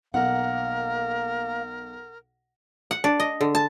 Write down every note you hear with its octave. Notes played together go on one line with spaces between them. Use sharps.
B1 A#3 A#4 F#5
F#5
D4
D#5
D3
A5